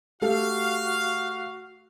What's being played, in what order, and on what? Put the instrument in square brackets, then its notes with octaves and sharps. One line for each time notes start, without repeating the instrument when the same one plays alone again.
[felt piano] A3 G4 A4 [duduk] F#4 [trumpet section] F5